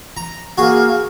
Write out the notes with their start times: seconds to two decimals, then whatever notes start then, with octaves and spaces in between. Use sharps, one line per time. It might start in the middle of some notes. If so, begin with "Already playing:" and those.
0.17 A#5
0.58 A#3 F#4 G#4